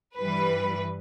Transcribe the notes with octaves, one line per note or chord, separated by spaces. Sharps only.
G2 E3 G3 B4